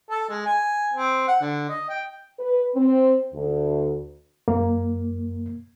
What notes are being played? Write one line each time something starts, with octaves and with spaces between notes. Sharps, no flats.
A4
G#3
G#5
C4
F#5
D3
D#5
G5
B4
C4
D2
F#2 A#3